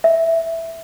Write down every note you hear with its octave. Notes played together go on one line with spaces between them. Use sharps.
E5